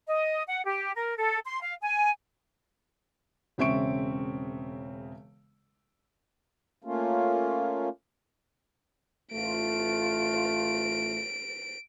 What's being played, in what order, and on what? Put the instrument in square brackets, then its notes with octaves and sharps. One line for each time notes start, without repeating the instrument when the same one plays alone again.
[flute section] D#5
F#5
G4
A#4
A4
C6
F5
G#5
[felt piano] E1 C#3 C4 E5 C#6 D7
[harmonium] A3 A#3 C#4 F4
[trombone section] A1 A3 F4 [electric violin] D7